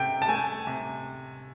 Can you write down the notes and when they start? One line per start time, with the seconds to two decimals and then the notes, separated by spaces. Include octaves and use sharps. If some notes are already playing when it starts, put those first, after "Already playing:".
Already playing: C3 A3 G5
0.22 A5
0.28 A3 G#5
0.67 C3